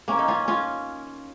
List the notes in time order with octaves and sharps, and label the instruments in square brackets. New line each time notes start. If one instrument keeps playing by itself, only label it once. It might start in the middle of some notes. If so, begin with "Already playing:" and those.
[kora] A#3 C#4
D#4
C#4 F4
C#4 F4